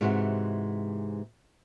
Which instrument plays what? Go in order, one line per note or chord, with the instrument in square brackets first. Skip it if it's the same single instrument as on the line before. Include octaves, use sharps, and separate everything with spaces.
[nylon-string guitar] G#2 C3 E3 G#3 F#4